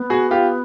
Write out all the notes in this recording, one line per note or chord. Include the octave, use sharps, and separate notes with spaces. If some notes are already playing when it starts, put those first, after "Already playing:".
Already playing: B3
F#4 G#4
F4 G4